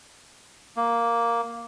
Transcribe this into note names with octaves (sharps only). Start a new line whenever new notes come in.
A#3